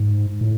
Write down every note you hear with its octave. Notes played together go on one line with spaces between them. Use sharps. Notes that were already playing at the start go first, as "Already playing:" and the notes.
Already playing: G#2
A2